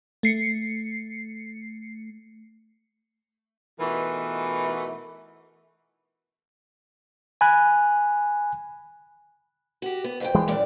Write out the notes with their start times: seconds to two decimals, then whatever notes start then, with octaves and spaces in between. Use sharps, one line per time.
0.23 A3 C7 C#7
3.79 B2 E3 A3 D#4 F4 A#4
7.41 G#5 B5 F#6
9.82 F#4 G4
10.04 B3
10.20 F2 G4 G5
10.35 E3 G#3
10.48 F#2 A#2 D5